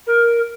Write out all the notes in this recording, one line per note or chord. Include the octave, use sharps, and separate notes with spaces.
A#4